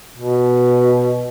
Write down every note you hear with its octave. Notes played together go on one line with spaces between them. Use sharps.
B2